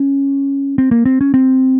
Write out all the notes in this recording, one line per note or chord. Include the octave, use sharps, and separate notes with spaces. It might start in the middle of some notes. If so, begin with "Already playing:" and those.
Already playing: C#4
C4
A#3
C4
C#4
C4